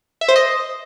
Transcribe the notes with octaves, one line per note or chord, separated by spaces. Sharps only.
E5
C5
D#5